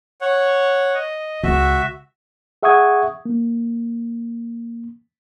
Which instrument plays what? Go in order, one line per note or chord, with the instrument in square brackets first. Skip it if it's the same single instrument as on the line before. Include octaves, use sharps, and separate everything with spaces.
[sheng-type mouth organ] C#5 F#5
D#5
[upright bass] C#2 [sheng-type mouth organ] F#4 E5
[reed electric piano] G#4 E5 F#5 C#6 D#6 G#6
A#3